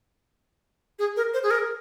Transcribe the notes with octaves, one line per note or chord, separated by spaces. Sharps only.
G#4
A#4
C5
G#4
A#4